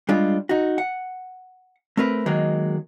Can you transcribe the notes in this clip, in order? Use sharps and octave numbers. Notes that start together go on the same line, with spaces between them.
G3 G#3 D4 F4
D#4 F#4
F#5
A3 C4 A#4 B4
D#3 F#3 G#3 A#3